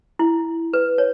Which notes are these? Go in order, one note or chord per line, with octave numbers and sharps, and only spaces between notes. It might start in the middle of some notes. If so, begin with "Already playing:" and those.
E4
B4
C#5